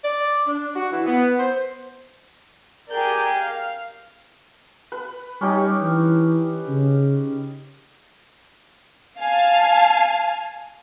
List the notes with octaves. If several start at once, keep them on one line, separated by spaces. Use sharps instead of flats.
D5
D4
F#4
E3
B3
C5
G4 G#4 A#4 D5 G6
F5
B4
G3 C#4 D#4 G4
E3
C#3
F5 G#5 A5